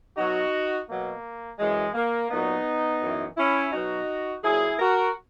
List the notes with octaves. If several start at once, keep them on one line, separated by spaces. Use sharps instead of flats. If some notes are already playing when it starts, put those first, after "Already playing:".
B2 F#3 D#4 F#4
B2 F#3 A#3
F#2 E3 G#3
A#3
A#2 F#3 B3 D#4
F#2 E3
C#4 E4
B2 F#3 D#4 F#4
A#2 F#3 E4 G#4
F#4 A#4